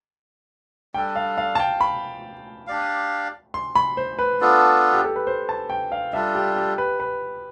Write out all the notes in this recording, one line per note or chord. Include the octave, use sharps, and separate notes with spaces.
G3 D4 A4 G5
F5
F5
A5
G5
B5
D4 G4 D5 F5
C6
B5
C5
B4
B3 D4 F4 A4
G4
A4
B4
C5
A5
G5
F5
G3 D4 F4 A4 E5
G4
G4
B4
B4